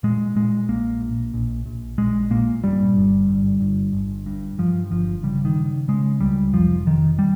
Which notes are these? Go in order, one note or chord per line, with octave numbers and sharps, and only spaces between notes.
A#2 G#3
A#2 G#3
A#1 A#3
A#1
A#1
A#1
A#1 G#3
A#2 A#3
G2 G3
G1
G1
G1
G1
G2
G2 F3
G1 F3
C#3 G3
D#3
C#3
C#3 G#3
C#2 G3
F1 F3
F1 D#3
G3